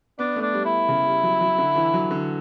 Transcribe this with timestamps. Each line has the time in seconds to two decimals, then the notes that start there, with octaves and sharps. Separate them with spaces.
0.19 B3 D4
0.36 A3
0.42 D4
0.53 G3
0.65 E4
0.89 C#3
1.06 G3
1.23 F#3
1.41 F#3
1.58 D3
1.76 E3
1.94 F#3
2.11 D3